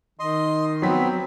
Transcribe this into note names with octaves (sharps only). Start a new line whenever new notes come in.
D#3 D#5 C6
F#3 B3 C4 B6